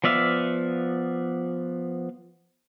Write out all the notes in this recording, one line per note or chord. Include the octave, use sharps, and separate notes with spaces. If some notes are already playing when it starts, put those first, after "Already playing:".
F3 B3 D5 E5 F5